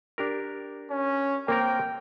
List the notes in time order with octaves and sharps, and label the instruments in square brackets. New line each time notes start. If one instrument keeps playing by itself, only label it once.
[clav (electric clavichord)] D4 G4 A#4
[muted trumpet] C#4
[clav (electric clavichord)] A#3 C4 A#4 [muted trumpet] G5